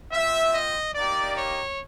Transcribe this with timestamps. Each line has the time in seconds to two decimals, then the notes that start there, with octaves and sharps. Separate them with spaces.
0.12 C4 F4 E5
0.54 D#5
0.95 A#3 D#4 G4 D5
1.37 C#5